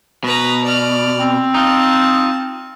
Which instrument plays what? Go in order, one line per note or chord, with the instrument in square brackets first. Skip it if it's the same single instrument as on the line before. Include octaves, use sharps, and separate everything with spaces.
[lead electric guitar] B2 [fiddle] B4 A#5
[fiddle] D5 F6
[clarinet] C4
[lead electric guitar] D#4 F4 [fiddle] A5